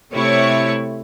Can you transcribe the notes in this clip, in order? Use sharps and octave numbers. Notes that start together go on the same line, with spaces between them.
C3 A3 E4 C#5 C#6